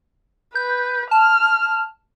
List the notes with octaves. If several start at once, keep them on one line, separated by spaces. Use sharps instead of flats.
B4 G6
A5 F6